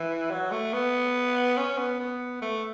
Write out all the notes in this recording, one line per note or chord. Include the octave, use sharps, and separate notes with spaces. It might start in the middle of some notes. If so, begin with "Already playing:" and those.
Already playing: E3
F#3
A3
B3
C#4
B3
B3
A3